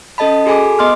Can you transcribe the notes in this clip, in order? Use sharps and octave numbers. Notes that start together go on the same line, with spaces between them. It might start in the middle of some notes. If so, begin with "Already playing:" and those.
C#4 A4 D#5 A5 B5
F#4 G#4 A4 G#5 B5 D6
B3 D#5 C6 D6 F6